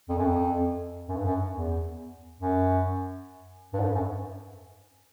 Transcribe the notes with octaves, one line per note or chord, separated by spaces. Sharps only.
F2
F#2
F2
F#2
G2
F#2
E2
F#2
G2
G#2
G2
F#2